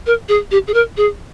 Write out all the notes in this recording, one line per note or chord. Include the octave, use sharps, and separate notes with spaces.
A#4
G#4
G4
G#4
A#4
G#4